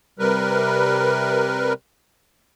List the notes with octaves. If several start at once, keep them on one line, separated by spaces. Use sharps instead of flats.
C3 G3 A#4 B4